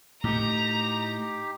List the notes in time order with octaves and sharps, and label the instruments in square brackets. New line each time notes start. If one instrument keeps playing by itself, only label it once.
[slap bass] A2 A3 [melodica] D#4 G4 [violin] A#5